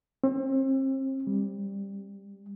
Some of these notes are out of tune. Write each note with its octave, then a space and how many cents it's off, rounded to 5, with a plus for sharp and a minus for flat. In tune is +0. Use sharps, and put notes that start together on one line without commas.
C4 +35
G3 +15